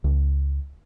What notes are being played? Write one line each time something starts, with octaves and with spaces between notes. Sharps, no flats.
C#2